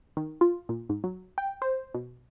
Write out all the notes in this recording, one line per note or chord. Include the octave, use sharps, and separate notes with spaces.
D#3
F4
A#2
G#2
F#3
G5
C5
B2